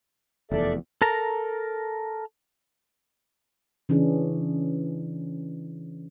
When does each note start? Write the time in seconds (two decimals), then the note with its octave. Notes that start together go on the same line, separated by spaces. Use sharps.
0.51 F1 E2 A4 D5 E5
1.02 A4 A#4 A#5
3.89 C#3 E3 C#4 D4 G#4